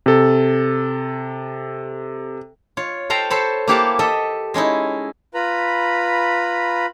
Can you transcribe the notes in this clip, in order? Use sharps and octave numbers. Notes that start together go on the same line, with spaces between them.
C3 A4
F4 C#5
A4 C5 F5 G5 A#5
A4 C5 C#5 A5 B5
A#3 E4 G4 F5 F#5 A5
A4 D#5 E5
G#3 C#4 D#4 E4
F4 B4 A#5 B5